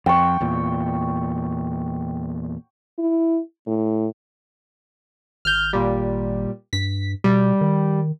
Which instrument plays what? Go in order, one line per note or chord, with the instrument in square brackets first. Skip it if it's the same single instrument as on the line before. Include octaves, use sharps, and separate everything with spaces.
[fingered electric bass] F2 [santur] G5 C#6
[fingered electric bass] E2 A#2
[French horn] E4
A2
[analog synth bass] G#1 [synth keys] F6 G6
[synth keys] A#2 G3
[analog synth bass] G2 [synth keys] B6
[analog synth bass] B2 [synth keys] G3
[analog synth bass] D#3